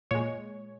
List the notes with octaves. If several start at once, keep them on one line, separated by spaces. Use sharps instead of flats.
A#2 G#3 C#5